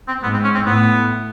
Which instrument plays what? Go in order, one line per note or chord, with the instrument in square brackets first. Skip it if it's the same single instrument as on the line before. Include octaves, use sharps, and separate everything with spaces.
[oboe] C4
[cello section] G#2 [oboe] B3
[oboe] C4
C#4
C4
[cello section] A2 [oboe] B3